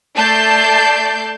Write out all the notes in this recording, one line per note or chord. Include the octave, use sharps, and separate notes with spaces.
A3 D5 A5 G6 C7